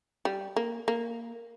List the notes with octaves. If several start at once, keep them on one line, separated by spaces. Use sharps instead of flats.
G3
A#3
A#3